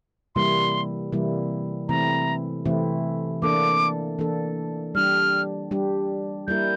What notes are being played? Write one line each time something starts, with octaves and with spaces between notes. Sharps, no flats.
C3 E3 G3 A#3 E4 C6
C3 E3 G3 A#3 E4
C3 E3 A3 C4 E4 A#5
C3 E3 A3 C4 E4
E3 A#3 D4 A4 D6
E3 A#3 D4 A4
G3 D4 G4 F6
G3 D4 G4
G3 A#3 E4 A#4 G6